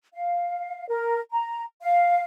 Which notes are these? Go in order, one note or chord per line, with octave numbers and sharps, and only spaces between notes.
F5
A#4
A#5
F5